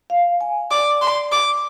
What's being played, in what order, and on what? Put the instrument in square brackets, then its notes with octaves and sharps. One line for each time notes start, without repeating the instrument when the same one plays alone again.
[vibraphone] F5
G#5
[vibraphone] D5 [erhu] D6
[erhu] C6
D6